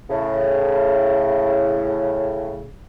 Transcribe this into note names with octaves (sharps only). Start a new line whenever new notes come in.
A2 C#3